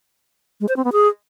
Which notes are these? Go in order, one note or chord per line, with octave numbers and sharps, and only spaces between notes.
G#3
C5
C4
B3
G#4